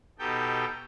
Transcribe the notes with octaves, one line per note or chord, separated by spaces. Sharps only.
B2 D#4 G4 A4 G5